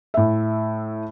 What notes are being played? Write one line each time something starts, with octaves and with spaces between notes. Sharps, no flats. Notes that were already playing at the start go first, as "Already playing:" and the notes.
A2 E5